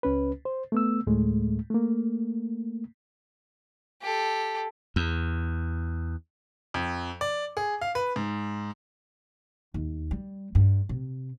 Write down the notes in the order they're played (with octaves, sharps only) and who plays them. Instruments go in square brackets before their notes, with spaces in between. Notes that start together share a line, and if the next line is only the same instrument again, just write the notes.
[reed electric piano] C#2 C#4 B4
C5
A3 B3 E6
D2 A2 G#3 A3
A3 A#3
[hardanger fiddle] G4 A4
[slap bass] E2
[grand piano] F2
D5
G#4
F5
B4
G#2
[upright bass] D#2
G3
G2
C3